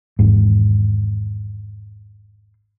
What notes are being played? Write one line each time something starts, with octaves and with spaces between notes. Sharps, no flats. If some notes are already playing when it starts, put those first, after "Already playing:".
G#1 E2 G#2